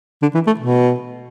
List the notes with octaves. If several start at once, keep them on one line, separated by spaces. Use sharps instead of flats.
D3
E3
A3
B2